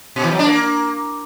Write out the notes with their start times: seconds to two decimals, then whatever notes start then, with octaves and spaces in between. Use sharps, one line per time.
0.16 B2
0.24 E3
0.31 F#3
0.39 D4
0.47 A#3